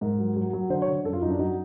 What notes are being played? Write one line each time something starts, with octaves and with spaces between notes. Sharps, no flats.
G#2 A#4
F#3
F#3
F#3
D3 C5
C#5
D3
F#2 A4
F4
F#2 D#4
D4
F#3 D#4